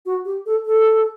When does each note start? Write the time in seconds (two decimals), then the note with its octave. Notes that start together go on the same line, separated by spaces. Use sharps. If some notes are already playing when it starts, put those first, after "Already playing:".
0.06 F#4
0.25 G4
0.46 A4
0.66 A4